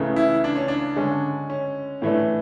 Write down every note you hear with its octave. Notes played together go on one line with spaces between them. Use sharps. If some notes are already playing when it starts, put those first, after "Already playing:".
Already playing: C#2 C#3 E3 A3
E4
D4
C#4
D4
D3 G#3 C#4
C#4
A2 E3 A3 D4